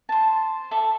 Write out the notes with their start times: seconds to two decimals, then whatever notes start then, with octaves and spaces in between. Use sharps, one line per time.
0.09 C5 A5
0.71 A4 D5 E5